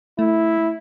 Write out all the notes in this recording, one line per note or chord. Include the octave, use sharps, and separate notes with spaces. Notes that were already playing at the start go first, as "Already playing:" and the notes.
A3 E4